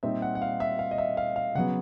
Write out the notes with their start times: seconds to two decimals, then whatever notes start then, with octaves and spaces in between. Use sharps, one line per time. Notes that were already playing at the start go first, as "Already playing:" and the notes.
0.03 A#2 G3 C4 D#4 E5
0.22 F#5
0.35 F#5
0.42 F5
0.60 E5
0.79 F5
0.91 D#5
0.98 E5
1.17 F5
1.36 F5
1.55 C#3 F#3 B3 F#5